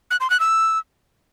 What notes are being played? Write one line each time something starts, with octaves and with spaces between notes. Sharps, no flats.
F#6
C6
F#6
E6